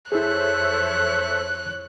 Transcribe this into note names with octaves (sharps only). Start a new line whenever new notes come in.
F2 E4 G#4 A4 C5 C#5 E5 F#6